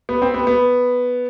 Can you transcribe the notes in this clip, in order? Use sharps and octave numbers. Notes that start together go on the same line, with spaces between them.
B3
C4
B3
B3